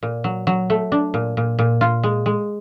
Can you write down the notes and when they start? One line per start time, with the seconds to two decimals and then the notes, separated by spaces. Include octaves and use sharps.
0.03 A#2
0.24 F#3
0.47 F#3
0.70 A3
0.92 D4
1.14 A#2
1.37 A#2
1.59 A#2
1.81 F4
2.03 G#3
2.26 G#3